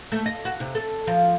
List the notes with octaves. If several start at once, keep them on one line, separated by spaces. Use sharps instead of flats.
A3
D#5
F#4
C3
A4
F3